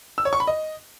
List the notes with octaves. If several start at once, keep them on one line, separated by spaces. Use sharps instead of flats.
E6
C#5
C#6
B5
D#5